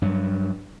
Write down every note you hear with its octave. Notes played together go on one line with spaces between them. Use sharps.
G2 F#3